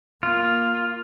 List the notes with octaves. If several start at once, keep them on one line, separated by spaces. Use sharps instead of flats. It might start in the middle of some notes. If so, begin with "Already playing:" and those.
A#3 F4